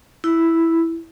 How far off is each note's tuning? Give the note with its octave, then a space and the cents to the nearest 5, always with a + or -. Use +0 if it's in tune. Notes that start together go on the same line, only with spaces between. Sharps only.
E4 +0